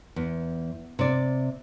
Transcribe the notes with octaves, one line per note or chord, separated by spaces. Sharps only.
E2
C3 D5